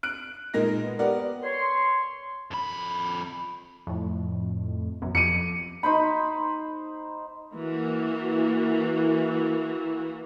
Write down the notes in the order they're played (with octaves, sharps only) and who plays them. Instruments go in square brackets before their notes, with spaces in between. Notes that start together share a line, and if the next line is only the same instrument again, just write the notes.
[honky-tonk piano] F#6 D7
A#2 G#3 D#4 A#4 A#6
B3
B3 G4 A#4 D5 F#5
[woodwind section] C#5 C6
[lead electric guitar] F2 B5
[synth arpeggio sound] F2 A2
A1 F#2 B2
[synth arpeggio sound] F2 [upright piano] C#7 D#7
[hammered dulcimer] D#4 C5 B5
[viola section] E3 A#3 F#4